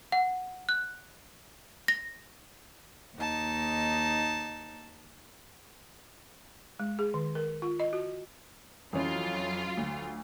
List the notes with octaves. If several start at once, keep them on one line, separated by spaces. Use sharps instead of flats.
F#5
F#6
A#6
D#2 D#4 A5
G#3
G#4
D#3
A#4
F4
D#5
F#4
F2 E3 F#3 C#4 F4
D2